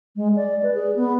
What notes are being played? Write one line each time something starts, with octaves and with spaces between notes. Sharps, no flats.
G#3
D5
B4
G#4
B3